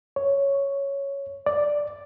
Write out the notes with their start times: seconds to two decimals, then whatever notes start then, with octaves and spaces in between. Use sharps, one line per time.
0.16 C#5
1.46 D5